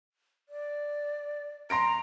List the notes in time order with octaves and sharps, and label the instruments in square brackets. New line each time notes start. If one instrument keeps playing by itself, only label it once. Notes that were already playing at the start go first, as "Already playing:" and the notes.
[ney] D5
[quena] A#5 [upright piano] C6 A#6 D7